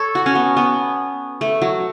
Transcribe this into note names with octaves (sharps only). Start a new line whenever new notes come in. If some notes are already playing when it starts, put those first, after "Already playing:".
Already playing: A4 C#5
F#4
C#4
B3
B3
A3
F#3